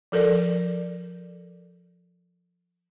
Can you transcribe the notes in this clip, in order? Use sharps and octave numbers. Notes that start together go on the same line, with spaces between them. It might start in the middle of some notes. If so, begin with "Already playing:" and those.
F3 A4 A#4 D5